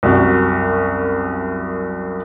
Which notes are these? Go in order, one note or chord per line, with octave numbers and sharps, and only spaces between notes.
C2 F#2 F#4